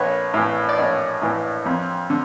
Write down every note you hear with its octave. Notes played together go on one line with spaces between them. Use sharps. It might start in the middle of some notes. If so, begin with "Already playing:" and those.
Already playing: A#1 B4 C#5
A2 E3
D5
A#1 C#5 D#5
A2 E3
F2
D3